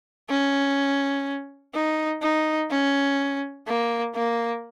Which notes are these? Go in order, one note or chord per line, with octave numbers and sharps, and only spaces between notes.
C#4
D#4
D#4
C#4
A#3
A#3